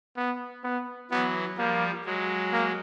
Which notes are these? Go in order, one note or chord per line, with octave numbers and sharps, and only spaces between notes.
B3
B3
E3 F#3 B3
F3 G3 A#3
F#3 G#3
A#3